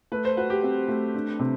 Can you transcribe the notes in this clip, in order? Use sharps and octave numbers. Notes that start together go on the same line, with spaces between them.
A3 B4
C5
F#4 B4
G4
C4
A3
D4
C3